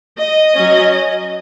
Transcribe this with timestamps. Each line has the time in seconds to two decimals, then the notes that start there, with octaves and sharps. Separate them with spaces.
0.18 D#5
0.55 F#3 C#4